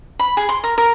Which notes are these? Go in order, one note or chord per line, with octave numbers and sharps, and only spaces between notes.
B5
G#4
C6
A#4
A#4